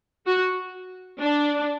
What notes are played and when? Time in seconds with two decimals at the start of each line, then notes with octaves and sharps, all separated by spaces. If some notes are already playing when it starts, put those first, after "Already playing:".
0.26 F#4
1.21 D4